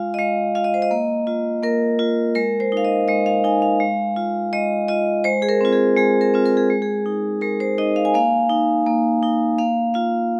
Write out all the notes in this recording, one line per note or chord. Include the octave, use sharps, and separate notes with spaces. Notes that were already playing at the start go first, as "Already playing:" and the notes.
Already playing: G#3 F4 F5
D#5
G#3 F5
F4 F5
D#5
C5
D#5
A#3
F4
A#3 A#4
F4
G#3 A#4
C5
D#4 F5
D#5
G#3 D#5
F5
D#4 G#5
F5
G#3
F4
G#3 D#5
F4 D#5
G#3 C5
G#4
A#4
C4 F4
G#4
G#3 G#4
A#4
C4 F4
A#4
G#4
G#3
G#4
D#4
G#3 A#4
C5
D#4 D#5
F5
G#5
A#3 F5
D#4
A#3
D#4
A#3 F5
F4 F5